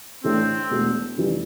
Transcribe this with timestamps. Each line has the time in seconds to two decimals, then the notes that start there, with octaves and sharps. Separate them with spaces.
0.24 A2 E3 A3 C4 D4
0.70 E1 E2 B2 A3
1.16 F1 F2 E3 G3